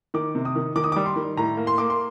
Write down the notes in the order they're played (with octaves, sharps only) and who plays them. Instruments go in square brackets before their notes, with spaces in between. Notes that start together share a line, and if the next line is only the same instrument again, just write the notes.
[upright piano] D#3 D6
C3
D#6
D#3
D#3 D6
D#6
G3 D6
C6
D#3
A2 A#5
A#3
C6
A#3 D6
C6